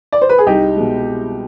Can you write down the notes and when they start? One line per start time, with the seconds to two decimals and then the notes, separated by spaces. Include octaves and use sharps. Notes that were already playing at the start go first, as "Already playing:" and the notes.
0.12 D5
0.21 C5
0.29 B4
0.38 G#4
0.47 C2 D#4 G4
0.76 B2 G#3